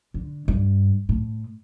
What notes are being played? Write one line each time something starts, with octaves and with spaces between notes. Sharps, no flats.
D3
G2
A2